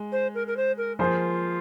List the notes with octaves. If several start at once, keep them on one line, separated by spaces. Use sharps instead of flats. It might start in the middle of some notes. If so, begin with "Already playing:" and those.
Already playing: G#3
C5
A#4
A#4
C5
A#4
F3 A#3 F4 G#4 C5